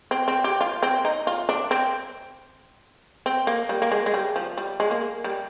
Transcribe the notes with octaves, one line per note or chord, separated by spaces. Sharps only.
C4
C4
G4
F4
C4
D#4
F4
D4
C4
C4
A#3
G3
A#3
G#3
G#3
G3
F3
G3
G#3
A#3
G3